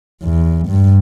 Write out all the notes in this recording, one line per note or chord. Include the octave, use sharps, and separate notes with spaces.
E2
G2